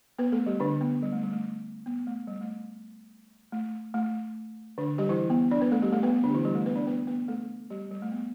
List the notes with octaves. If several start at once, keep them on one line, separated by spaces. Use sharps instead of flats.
B3 B4
A3 A4
G3 G4
D3 D4
B3
G3
A3
G3
A3
B3
A3
G3
A3
A3
A3
D3 D4
G3 G4
E3 E4
B3
D4 D5
B3 B4
A3 A4
G3 G4
A3 A4
B3 B4
B3
D3 D4
G4
E3 E4
G3 G4
A3 A4
B3 B4
D4 D5
B3 B4
B3 B4
A3 A4
G3 G4
G3
A3
B3